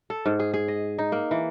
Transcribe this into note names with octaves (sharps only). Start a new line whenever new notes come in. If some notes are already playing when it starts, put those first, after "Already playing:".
A4
G#2
G#4
G#4
D#5
D#4
A#3
E3